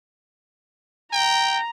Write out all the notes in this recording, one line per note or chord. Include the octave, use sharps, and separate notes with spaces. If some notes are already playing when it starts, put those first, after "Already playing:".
G5 A#5